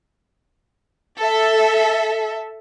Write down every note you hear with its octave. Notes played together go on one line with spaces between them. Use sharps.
A4 E5